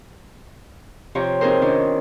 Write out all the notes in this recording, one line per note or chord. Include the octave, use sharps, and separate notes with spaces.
C3 F3 F4 G4 C#5 A#5
C4 D#4 G#4 A#4 C5
D#3 C#4 D4 F4